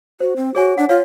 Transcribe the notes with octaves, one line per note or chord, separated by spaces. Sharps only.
F#4 C5
C4
F#4 G#4 C#5 G#5
D4 F#5
F4 C#5 F5